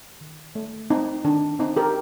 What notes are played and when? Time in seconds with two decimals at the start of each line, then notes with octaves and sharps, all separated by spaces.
0.21 D#3
0.55 A3
0.90 C4 D#4
1.25 D#3 D4
1.59 C4 D#4
1.77 G4 A#4